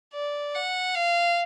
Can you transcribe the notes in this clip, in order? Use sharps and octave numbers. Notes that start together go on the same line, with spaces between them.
D5
F#5
F5